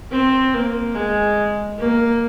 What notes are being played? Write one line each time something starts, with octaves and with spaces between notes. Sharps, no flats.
C4
A#3
G#3
A#3